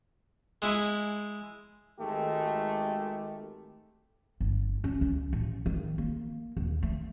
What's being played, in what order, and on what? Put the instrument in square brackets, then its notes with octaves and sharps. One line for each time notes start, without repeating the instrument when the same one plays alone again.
[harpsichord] G#3 E4
[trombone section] G#1 D#3 G#3 A3 G4
[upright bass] G1
C#4
C#2
A1
D#3
A#3
D#2
A3